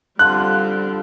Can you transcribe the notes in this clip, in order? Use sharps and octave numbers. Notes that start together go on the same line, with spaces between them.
D3 F3 G3 C4 F4 F#6